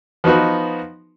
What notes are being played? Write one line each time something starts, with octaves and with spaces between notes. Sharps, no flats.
F3 B3 D#4 F#4 B4